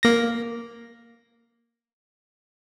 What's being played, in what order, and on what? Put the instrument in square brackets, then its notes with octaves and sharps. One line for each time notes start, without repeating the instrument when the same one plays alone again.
[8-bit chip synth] A#3 A#6